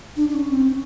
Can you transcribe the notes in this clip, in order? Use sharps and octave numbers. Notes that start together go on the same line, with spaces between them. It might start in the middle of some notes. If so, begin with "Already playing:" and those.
D4
D4
C#4
C4
C#4